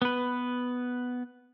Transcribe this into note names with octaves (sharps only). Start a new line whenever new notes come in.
B3 B4